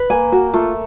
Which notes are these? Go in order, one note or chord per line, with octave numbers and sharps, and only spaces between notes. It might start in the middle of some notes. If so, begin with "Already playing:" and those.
Already playing: B4
A#3 G#5
F#4
A3 F4